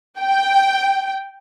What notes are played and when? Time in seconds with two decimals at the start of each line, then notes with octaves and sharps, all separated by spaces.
0.20 G5